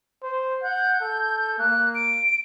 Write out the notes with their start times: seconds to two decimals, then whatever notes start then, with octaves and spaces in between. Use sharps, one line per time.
0.23 C5
0.63 F#5 G6
1.01 A4
1.59 A#3 F#6
1.95 D7